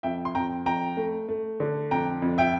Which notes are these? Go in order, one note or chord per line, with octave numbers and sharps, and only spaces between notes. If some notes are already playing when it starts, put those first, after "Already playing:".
F2 E5 G5
C6
F2 G5 A#5
F2 G5 A#5
A3
A3
D3
F2 G5 A#5
F2
E5 G5